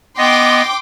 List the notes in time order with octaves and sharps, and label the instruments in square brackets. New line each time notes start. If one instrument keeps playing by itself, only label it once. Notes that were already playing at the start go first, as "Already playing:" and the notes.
[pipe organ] B3 D#5 [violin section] G5 C6 D6